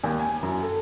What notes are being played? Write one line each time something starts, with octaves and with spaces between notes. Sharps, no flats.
D#2
G#5
F#2
A4